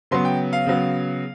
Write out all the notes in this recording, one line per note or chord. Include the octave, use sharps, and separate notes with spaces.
C#3 F#3 B3 C6
G5
F5
C#3 F#3 B3